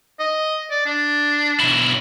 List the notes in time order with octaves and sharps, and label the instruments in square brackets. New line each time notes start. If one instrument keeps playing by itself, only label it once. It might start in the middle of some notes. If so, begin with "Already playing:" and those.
[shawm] D#5
D5
D4
[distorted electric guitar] B1 E4